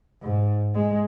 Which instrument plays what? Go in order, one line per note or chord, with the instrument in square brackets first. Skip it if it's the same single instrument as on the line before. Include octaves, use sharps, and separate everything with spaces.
[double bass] G#2
G#3